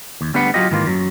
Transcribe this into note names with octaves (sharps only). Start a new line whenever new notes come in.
D#2
D2 G3 B3 D4 B4 F#5
F#3 F4 G4 D#5
G#2 D#3 E3 A#3 F4
F#2 F#3